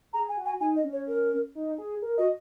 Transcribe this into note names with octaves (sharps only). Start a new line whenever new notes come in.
G#4 A#5
G#5
F#4
G#5
D#4 G#5
D#5
C#4
C#5
A#4
D#4
G#4
A#4
F#4 D#5